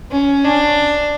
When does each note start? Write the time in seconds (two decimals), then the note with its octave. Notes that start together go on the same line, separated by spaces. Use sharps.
0.11 C#4
0.45 D4